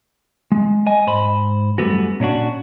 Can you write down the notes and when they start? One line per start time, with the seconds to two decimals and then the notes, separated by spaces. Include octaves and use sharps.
0.52 G#3
0.87 D#5 G#5
1.07 G#2 C5 B5
1.78 F#2 E3 G3 A3 B3 F#4
2.20 A#2 C#4 D4 F#4